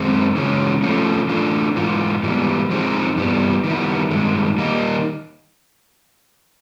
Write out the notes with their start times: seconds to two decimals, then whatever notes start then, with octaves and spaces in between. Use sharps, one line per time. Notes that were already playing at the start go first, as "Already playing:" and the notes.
Already playing: F#2 D#3 G#3 C4 D#4
0.36 C#3 E3 G#3 C#4
0.83 F3 A3 C#4 F4
1.29 E3 A3 D4 F4
1.76 G#2 E3 F4
2.23 G#2 E3 G3 B3
2.70 F3 G#3 C4 D#4 G#4
3.17 G2 E3 G3 B3
3.64 D#3 G3 B3 E4
4.11 G2 D#3 G#3
4.58 D#3 G3 A#3 D#4